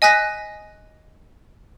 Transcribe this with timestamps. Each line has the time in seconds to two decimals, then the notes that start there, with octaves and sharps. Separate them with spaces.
0.02 D#5 G#5 D#6 F#6 A#6 B6